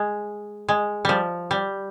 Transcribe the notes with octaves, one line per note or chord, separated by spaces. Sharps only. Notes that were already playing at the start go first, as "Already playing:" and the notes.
Already playing: G#3
G#3
F3 G3
G3